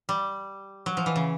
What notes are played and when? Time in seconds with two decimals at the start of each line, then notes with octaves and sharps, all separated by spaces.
0.09 G3
0.86 F#3
0.97 F3
1.06 E3
1.16 C#3